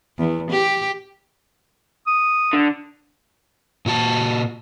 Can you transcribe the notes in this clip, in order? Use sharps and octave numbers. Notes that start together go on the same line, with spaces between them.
E2
G4
D#6
D3
A#2 F#4 A5